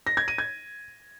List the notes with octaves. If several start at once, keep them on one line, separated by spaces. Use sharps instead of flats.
A#6
G#6
D#7
G#6